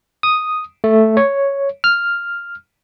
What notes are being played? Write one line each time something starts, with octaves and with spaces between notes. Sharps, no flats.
D#6
A3
C#5
F6